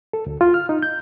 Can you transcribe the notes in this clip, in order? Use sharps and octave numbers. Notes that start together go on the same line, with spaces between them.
A4
D2
F4
F6
D#4
G6